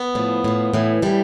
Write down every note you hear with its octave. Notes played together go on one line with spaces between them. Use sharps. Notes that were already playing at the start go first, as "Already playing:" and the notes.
Already playing: B3
A2 F3
A2 F3
A2 E3
A2 E3 G3